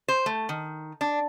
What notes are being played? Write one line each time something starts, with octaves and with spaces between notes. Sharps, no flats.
C5
A3
D#3
D4